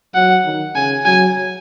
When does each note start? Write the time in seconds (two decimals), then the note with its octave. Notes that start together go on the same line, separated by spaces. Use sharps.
0.15 F#3 F#5
0.45 D#3
0.75 C#3 G#5
1.05 F#3 G#5